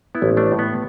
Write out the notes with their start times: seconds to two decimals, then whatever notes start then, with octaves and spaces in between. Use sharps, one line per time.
0.15 B3 E4
0.22 A1
0.37 A3 D4
0.52 A2
0.59 B3